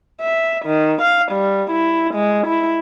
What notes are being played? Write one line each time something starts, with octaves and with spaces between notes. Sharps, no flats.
E5
D#3
F5
G3
E4
G#3
E4